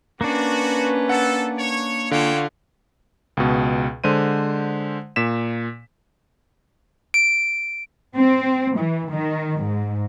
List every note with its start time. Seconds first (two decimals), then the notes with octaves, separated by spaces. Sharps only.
0.21 A#3 C#4 D4 F#4 B4
1.09 A4 F#5
1.57 C#5
2.11 D3 F4 F#4 C#5 F5 G5
3.37 C#2 B2
4.04 D3 G#3 C5 D#7
5.16 A#2 B6 E7
7.14 D7
8.17 C4
8.77 E3
9.10 D#3
9.62 G#2